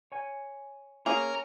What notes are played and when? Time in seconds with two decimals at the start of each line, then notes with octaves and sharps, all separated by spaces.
0.12 C#5 G#5
1.06 A#3 C#4 G#4 A#4